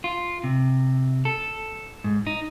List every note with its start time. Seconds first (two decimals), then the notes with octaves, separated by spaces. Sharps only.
0.04 F4
0.44 C3
1.25 A4
2.04 G#2
2.27 D#4